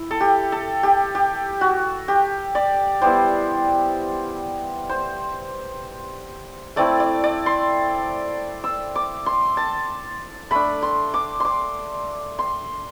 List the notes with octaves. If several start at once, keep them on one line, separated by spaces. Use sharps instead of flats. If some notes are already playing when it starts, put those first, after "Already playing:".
Already playing: E4
A4
G4
A4
G4
G4
F#4
G4
D5
G3 B3 E4 C5
C5
A3 C4 E4 D5
D5
D5
C6
E6
D6
C6
A5
A3 D4 B5
C6
D6
C6 D6
C6